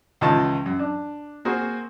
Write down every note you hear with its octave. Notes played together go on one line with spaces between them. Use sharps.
C#2 D#3 E3 D#4 F4 A5
F#2
D4
A#3 C4 F#4 G#4